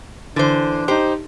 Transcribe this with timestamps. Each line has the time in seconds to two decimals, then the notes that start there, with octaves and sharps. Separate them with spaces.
0.36 D3 E3 D4 C5
0.88 D#4 G4 C5